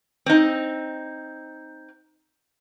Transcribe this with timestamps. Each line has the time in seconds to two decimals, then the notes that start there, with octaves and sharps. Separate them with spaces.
0.26 C4 D#4